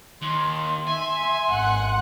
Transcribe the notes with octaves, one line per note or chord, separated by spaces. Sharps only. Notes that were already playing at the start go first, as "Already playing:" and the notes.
D#2 C6
E5 G#5
G#1 F#5 F#6